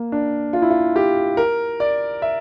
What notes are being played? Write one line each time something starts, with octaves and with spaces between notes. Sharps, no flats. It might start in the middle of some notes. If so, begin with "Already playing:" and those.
Already playing: A#3
D4
F4
E4
F4
G4
A#4
D5
E5